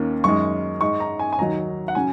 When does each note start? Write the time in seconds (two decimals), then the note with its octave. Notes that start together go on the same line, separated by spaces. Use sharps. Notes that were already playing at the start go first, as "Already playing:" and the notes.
Already playing: D#2 D#3 A#3 C#4
0.24 F#2 D#3 G#3 C#6
0.81 G#2 G#3 D#4 C#6
1.00 A#5
1.19 G#5
1.33 G#5
1.38 D#2 D#3 F#3 D#4 A#5
1.88 F#5
1.95 C#3 F#3 C#4 G#5